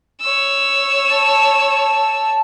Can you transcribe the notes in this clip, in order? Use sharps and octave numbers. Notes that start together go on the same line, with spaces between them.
C#5 E6
A5